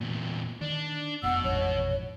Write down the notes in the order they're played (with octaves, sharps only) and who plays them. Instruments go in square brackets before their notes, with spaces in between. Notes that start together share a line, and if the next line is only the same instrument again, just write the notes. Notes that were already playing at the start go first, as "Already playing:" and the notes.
[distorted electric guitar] E2 A#2
[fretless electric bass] D#3 [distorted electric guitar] D4
[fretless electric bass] F1 [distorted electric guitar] B2 [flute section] F#5 E6
[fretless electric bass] A1 F2 G#2 [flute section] C#5